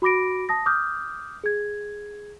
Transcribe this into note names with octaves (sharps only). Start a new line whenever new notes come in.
F#4 B5 D6 A#6 D7
A5 D#6 A#6
D6 D#6 F6 G6
G#4 G#6